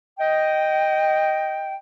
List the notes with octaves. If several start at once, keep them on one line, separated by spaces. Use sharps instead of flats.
D#5 G5